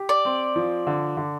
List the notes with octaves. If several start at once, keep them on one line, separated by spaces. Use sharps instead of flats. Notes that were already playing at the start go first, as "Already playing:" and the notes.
Already playing: G4
D5
C4
F3
D3
D3